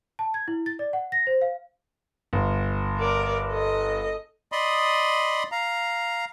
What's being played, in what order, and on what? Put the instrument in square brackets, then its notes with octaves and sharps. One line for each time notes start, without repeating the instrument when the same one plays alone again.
[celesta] A5
G#6
E4
A6
D5
F#5
A#6
C5
F5
[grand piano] G1
[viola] A#4 D5
A4 D#5
[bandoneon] D5 D#5 B5 C6 D#6
F5 A#5